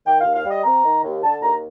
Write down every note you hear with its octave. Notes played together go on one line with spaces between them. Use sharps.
D#3 G5
D#2 F5
F5
G3
D#5
C4 A#5
D#3
D#2
D3 A5
D#2 A#5